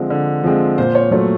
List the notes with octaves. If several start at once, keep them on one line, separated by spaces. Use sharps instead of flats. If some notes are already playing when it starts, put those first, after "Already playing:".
Already playing: D3 F3 G#3 C4
D3
F3 G#3 C4
A#2 C5
C#5
F#3 A3 C#5